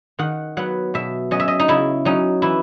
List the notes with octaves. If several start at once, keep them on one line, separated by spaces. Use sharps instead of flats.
D#3 F#5
F#3 B3 F#5
B2 E5
F#3 C#4 D#5
E5
D#5
D#4
C#3 E4
F#3 C#4 D#4
E3 E4